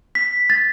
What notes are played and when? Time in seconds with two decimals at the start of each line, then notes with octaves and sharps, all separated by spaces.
0.15 B6
0.50 A6